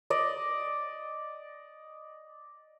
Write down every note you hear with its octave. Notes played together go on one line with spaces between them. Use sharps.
D5 D#5